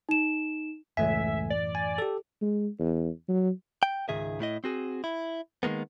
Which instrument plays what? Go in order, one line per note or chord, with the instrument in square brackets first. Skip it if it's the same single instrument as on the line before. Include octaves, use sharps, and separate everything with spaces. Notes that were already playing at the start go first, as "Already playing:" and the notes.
[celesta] D#4 E7
[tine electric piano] C#2 A3 G#5 [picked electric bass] F#2 A2 E3 [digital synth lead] E5
[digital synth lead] D5
[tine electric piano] G#5
G4 A4
[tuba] G#3
E2
F#3
[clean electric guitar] G5
C#2 G#2 D#3 G#4 E5
A2 E4 D#5
C4 F#4 G#4
E4
D#3 G#3 A#3 B3